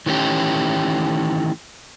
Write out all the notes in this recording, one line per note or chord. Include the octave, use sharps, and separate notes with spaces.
D#3 E3 A3 C#4 G4